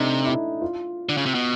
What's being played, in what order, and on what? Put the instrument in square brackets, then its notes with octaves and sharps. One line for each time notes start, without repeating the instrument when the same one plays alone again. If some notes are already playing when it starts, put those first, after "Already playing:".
Already playing: [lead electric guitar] C3 [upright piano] A3 D4 D#4
[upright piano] E4
F4
[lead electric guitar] D3
C#3
C3
B2